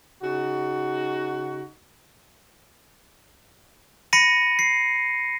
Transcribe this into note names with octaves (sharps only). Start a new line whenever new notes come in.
C#3 D#4 F#4
B5 A#6 C#7 D#7
C7